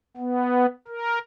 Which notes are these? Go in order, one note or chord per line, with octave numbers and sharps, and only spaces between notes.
B3
A#4